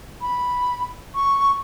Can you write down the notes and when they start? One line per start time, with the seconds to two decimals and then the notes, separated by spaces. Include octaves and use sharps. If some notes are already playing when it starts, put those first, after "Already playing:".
0.21 B5
1.15 C#6